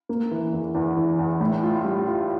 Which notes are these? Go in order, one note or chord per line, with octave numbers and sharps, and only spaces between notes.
A#3
E3
E2
E2
E3
E2
A2
F4
G3
F4